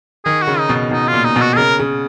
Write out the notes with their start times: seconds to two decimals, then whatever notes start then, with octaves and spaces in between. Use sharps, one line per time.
0.25 D#3 G#4
0.41 F#4
0.47 C#3
0.58 D#4
0.69 B2
0.91 B2 D#4
1.07 F4
1.13 A#2
1.24 D#4
1.36 B2 F#4
1.53 G#4
1.57 C#3 A#4
1.79 C#3